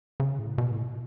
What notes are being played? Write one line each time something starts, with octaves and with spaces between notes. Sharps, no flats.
C#3
A2
B2
A2